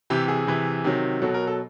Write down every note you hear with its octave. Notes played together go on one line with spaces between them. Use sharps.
C3 E3 G4
G#4
C3 E3
C3 D#3 F#3
B2 F#3 A4
A#4
A4